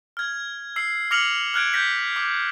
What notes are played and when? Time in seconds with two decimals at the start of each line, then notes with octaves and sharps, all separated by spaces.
0.17 F6 G#6
0.76 E6 C7
1.11 D6 F6 A#6 C#7 F7 F#7
1.54 F6 F#6 G#6 D7
1.74 G6 A#6 B6
2.16 D6